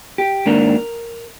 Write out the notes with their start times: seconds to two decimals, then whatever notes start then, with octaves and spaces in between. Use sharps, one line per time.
0.18 G4
0.46 G#2 D#3 A#3 D4 A#4